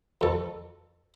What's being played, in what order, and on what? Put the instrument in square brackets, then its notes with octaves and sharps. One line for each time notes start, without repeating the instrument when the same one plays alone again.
[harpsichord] F2 A4